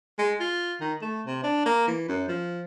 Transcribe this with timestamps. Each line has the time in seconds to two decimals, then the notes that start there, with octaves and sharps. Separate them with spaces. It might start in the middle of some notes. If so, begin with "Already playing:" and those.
0.19 G#3
0.40 F4
0.80 D#3
1.02 A3
1.27 C3
1.43 D4
1.66 A#3
1.87 E3
2.08 F#2
2.28 F3